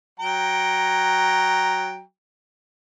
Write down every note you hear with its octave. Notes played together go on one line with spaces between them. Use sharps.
F#3 G5 A#5